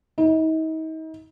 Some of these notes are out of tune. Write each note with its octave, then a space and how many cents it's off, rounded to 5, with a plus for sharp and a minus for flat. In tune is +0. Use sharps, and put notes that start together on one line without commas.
D#4 +40